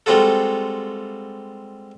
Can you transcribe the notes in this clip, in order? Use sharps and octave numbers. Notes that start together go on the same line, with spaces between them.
G3 G#3 C4 F4 F#4 A4